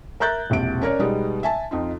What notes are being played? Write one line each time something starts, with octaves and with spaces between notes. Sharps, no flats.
A#4 E5 A#5 F#6 G6 A6
E1 A#1 C3 D7
C#4 A#4 C#5 D5
B2 G3 G#3 B3 D#4
E5 G#5 A5
F2 D#4 F4